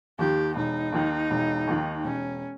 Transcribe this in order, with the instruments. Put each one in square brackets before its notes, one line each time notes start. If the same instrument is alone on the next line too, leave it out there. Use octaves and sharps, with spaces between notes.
[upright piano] D#2 D#3 [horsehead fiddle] G4
[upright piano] E1 [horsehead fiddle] D#4
[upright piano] D#2 D#3
E1
D#2 D#3
[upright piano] E1 [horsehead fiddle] C#4